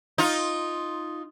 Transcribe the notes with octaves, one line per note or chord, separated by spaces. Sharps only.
D#4 F4